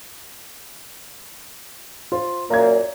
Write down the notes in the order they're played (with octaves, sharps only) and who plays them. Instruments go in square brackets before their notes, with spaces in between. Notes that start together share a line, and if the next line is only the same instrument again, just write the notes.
[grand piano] F4 C5
[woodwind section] F#2 A#2 A#3 [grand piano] A#5 G#6